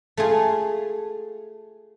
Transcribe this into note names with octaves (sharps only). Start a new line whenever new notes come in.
A3 F4 G#4